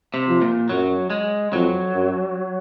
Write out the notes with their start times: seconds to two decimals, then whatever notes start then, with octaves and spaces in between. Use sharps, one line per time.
0.14 C3
0.28 F3
0.42 A#2
0.69 F#2 F#3
1.10 G#3
1.52 F2 F#3
1.94 F#2